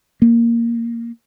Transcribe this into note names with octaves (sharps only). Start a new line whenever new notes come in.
A#3